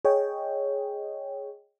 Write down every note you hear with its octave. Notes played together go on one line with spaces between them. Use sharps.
G#4 C#5 D#5 G5